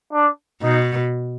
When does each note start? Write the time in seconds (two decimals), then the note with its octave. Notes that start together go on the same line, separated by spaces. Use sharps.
0.13 D4
0.62 B2 D#4